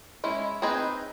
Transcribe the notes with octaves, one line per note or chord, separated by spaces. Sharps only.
G#3 C#4 E4
C4 D#4 G#4 B4 D#5